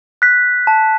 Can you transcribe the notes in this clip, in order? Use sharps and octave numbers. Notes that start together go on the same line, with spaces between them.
F#6 B6
A5